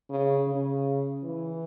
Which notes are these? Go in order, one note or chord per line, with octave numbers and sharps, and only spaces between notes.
C#3
C#3
E3